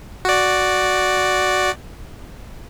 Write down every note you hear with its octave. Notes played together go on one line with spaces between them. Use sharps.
F#4 D5